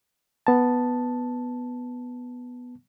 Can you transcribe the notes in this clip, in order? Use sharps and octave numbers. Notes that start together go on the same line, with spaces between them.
B3 A5